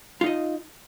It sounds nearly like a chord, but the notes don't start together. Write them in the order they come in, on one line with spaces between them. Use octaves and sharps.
F4 D#4 D#5